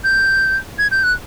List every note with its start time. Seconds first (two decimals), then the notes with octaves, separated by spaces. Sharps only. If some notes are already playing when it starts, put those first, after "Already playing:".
0.04 G6
0.79 G#6
0.91 G6
1.04 F#6